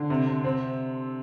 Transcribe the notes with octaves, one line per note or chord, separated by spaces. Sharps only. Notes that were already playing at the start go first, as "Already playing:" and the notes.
Already playing: D3
C3
C3
C4